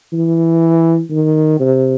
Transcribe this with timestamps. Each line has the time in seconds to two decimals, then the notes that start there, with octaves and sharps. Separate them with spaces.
0.13 E3
1.11 D#3
1.60 C3